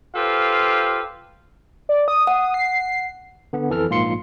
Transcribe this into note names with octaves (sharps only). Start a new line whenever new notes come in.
F4 G4 A4 B4 C5 F5
D5
D#6
F#5
C7
D3 B3
F2 E3 A4 F6
A#1 G#2 A#3 F4 C6 C#7